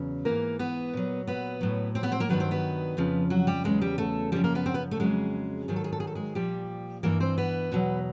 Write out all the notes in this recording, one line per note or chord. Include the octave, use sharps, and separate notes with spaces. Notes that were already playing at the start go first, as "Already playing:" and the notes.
Already playing: E2 C#3 F#3
G#2 E3 A#3 A#4
B3 B4
A#2 F#3
B3 B4
A2 F#3
C4 C5
B3 B4
C4 C5
A#3 A#4
G2 D#3 F#3 B3 B4
C4 C5
B3 B4
F2 C#3 F3
F#3 F#4
G3 G4
E2 C#3 F#3 G#3 G#4
G3 G4
A3 A4
F#2 C#3 F3 G3 G4
A#3 A#4
B3 B4
C4 C5
B3 B4
A3 A4
F2 C#3 F#3 G#3 G#4
G#2 D#3 F#3 G#4
A4
G#4
A4
G#4
A4
G#3 G#4
A#2 F3 G3 G4
G2 E3 A#3 A#4
C4 C5
B3 B4
E2 B2 F#3